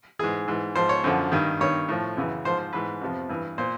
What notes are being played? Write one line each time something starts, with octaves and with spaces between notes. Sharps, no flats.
G#2 E3 G#4
G#2 E3
G#2 F3 C5
C#5
F#2 D3 F3
G2 D#3
G2 D#3 C#5
A2 F3
F#2 C#3 E3
G#2 F3 C5
C5
G#2 E3 B4
F2 C3 F3
G2 E3
A#2 C5